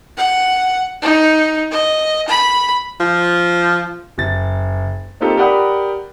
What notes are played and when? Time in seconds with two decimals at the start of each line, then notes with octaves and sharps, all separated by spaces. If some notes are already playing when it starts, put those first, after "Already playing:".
0.18 F#5
1.02 D#4
1.72 D#5
2.28 B5
3.00 F3
4.18 F#1 A6
5.20 A#3 C4 D#4 F4 G4 A4
5.37 G4 A#4 D5 F#5 B5 D#6